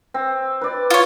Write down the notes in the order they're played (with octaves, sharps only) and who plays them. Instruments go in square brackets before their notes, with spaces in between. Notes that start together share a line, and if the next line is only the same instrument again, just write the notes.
[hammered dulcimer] C4
B4 D5
[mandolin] F4 C#5